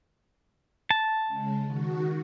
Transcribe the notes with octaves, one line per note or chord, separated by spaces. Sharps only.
A5
C#3 G#3
D#3 F#4